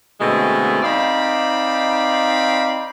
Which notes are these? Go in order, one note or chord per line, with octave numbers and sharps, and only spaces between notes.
B2 D3 G#3 A3 C4
C4 D#4 D5 F5 B5